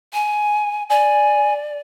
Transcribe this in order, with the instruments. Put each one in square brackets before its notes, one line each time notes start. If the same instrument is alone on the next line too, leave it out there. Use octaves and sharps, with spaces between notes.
[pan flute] G#5
[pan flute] D5 [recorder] G#5